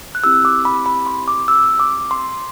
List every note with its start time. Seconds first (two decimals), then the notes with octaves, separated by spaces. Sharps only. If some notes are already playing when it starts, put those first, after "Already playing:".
0.15 F#6
0.24 C4 E4 G4 E6
0.45 D6
0.65 B5
0.86 B5
1.07 C6
1.28 D6
1.48 E6
1.79 D6
2.11 C6